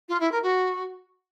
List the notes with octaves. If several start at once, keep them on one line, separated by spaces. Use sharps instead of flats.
F4
E4
A#4
F#4